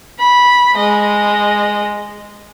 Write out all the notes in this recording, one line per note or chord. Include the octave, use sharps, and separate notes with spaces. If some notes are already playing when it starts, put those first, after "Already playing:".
B5
G#3 D#5